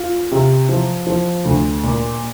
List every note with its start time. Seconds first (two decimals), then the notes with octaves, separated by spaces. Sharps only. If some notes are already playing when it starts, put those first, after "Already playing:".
Already playing: F4
0.32 C3
0.69 F3
1.07 F3
1.45 D2
1.83 A#2